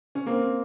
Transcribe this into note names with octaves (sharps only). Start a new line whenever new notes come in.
C#4
A#3 C4